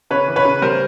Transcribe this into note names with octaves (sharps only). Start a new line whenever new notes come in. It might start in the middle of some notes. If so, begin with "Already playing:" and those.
C#3 B4 C#5
E3
B4 C#5
C#3
G3 A#4 C5